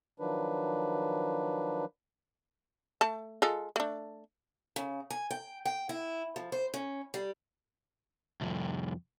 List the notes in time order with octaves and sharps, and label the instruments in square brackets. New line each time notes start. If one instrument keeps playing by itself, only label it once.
[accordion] D#3 F3 F#3 D4 B4
[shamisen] A3 A5
G#3 F4 A4
A3 D4
[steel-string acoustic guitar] C#3
G#5
G5
G5
E4
F3
C5
C#4
G3
[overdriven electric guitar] C2 F2